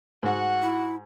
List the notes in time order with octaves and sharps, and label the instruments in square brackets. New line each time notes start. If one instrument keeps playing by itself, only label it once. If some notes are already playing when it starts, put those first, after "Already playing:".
[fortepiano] G#2 [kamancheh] F#4 F#5
[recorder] E4